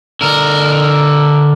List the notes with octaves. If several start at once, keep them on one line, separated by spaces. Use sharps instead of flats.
D3 A#4